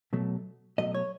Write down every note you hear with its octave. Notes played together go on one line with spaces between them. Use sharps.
B2 F#3 A3
B2 F#3 A3 D#5
C#5